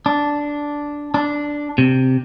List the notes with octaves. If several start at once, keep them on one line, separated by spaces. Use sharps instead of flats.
D4
D4
C3